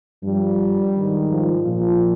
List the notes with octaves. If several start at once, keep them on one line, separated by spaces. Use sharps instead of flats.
G2 F3 G3
G#2 D#3
F3
A#2 F3